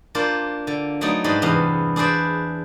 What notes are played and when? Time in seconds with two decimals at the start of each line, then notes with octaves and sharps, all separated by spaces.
0.15 A#3 D4 F4 C5
0.67 D3
1.01 F#3 A3 B3 D#4 D5
1.24 G#2 D4 G4 B4 D#5 C6
1.42 E2 G2 C3 B3 F5
1.96 D4 G#4 B4 C5 D5